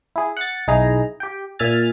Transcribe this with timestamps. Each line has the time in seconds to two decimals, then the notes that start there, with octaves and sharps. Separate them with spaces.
0.16 E4 G#4
0.37 F#5 A6
0.68 B1 D#4 E4 G#4 A#5
1.20 G4 G5
1.59 A#2 E5 G#5 F6 A6